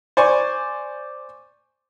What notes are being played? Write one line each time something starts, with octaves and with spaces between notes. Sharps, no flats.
C5 D5 G#5 C#6